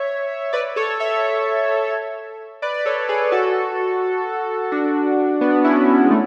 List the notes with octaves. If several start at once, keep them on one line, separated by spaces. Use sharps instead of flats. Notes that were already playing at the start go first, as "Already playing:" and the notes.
Already playing: C#5 E5
B4 D5
A4 C#5
C#5 E5
B4 D5
D5
A4 C#5
G#4 B4
F#4 A4
D4 F#4
B3 D4
C#4 E4
G#3
A3